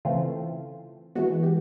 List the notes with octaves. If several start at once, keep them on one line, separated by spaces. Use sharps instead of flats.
C#3 E3 A3 C4 F4
E3 G#3 B3 F#4
G4